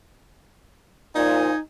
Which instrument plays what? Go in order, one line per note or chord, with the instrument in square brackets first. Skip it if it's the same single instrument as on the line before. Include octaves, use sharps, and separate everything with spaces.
[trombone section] A#2 F3 [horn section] D#4 G#5